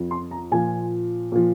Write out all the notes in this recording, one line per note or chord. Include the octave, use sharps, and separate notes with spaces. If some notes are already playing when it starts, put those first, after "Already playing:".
Already playing: F2 F3
C6
A#5
A#2 F3 G#5
A#2 F3